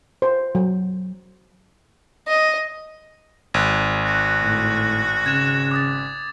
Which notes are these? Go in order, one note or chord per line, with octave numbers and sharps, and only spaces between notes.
C5
F#3
D#5
G#1 F#6 G#6
F#4
A2
C#3 G#6 E7
D6 D#6 A6